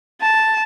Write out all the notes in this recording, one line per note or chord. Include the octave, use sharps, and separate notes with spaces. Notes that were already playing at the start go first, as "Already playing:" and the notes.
A5